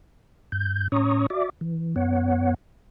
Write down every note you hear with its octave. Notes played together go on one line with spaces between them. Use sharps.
G2 G6
A2 C#4 C#5 A#5 C#6 D#6
F#4 D5 E5 D6
E3
F#2 B3 C#5 F#5